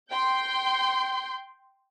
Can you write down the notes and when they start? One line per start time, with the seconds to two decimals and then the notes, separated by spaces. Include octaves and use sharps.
0.11 G5 C6 G6